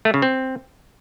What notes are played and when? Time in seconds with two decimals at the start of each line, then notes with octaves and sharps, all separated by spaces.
0.05 A3
0.14 C#3
0.22 C4